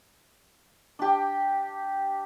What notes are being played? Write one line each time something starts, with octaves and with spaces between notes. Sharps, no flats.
D4 G4